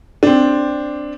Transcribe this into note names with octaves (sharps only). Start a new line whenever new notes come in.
C4 D4